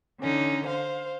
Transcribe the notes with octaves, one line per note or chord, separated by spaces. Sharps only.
D3 C#4 D#4
C5 F5